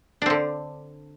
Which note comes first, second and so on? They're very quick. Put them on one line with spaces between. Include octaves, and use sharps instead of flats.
D4 C4 D3